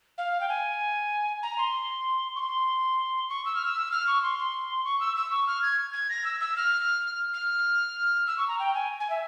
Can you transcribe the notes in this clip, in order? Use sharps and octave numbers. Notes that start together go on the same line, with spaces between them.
F5
G5
G#5
A#5
C6
C#6
C6
C#6
E6
F6
E6
F6
C#6
C6
C6
C#6
E6
E6
C#6
F6
G#6
G#6
A#6
E6
E6
F6
F6
E6
C#6
A#5
G5
G#5
G#5
E5